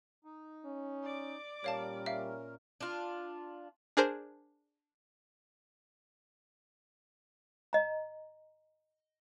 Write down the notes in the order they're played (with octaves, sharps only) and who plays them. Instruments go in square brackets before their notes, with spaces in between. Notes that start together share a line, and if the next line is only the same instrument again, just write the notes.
[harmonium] D#4
[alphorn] C#4
[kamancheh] D5 D6
[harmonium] A#2 C#4 A#4 [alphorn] G3 [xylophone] C#5 F5 A5
[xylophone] E5 F5
[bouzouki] D4 F4
[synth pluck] D4 G#4 A#4 C5
[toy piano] D#5 A#5